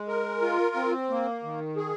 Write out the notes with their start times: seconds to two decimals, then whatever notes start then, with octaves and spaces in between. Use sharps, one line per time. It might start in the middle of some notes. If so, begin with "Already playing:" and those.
Already playing: G#3
0.08 A#4
0.42 F4
0.75 C4
1.10 A#3
1.43 D#3
1.77 G#4